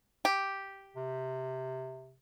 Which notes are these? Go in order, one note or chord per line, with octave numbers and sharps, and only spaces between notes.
G4
C3